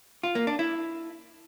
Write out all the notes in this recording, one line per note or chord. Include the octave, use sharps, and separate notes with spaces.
F4
A#3
D4
E4